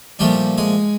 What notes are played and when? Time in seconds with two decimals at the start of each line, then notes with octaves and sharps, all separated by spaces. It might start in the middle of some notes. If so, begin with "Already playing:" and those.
0.19 A#2 F3 G3 A3 D4 G4
0.58 G#3 G#4